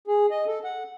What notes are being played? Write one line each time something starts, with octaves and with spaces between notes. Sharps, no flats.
G#4
D#5
A4
F#5